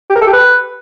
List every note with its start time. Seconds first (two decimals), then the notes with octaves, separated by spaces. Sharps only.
0.09 G4
0.15 A#4
0.21 A4
0.27 G4
0.33 B4